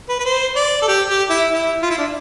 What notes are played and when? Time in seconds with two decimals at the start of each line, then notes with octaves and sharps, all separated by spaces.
0.09 B4
0.20 B4
0.25 C5
0.56 D5
0.82 A4
0.88 G4
1.09 G4
1.30 E4
1.51 E4
1.82 F4
1.90 E4
1.98 D4